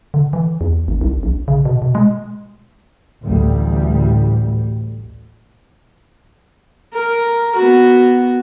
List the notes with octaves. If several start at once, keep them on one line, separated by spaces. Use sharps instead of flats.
D3
E3
E2
G#1
C2
A#1
C#3
B2
B2
G#3
A1 D2 G3
A#4
B3 F#4